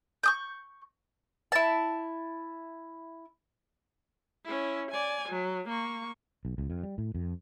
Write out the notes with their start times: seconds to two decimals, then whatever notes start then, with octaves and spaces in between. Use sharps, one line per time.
0.24 C#6 D#6 G6
1.52 E4 A5
4.45 C#4 E4
4.91 D5 G#5
5.29 F#3
5.69 A#3 C#6
6.45 B1
6.58 C#2
6.70 F2
6.83 G3
6.98 A2
7.15 F2